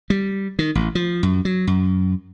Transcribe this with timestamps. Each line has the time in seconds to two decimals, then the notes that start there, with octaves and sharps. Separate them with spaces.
0.10 G3
0.59 D#3
0.75 A1
0.95 F3
1.23 F#2
1.45 F#3
1.67 F#2